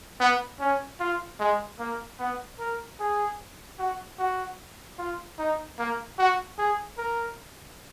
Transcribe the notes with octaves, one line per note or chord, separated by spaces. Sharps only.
B3
C#4
F4
G#3
A#3
B3
A#4
G#4
F#4
F#4
F4
D#4
A#3
F#4
G#4
A#4